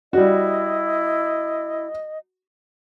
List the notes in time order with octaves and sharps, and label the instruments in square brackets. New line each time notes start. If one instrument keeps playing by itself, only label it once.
[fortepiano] G3 F#4 [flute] E4 [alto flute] D#5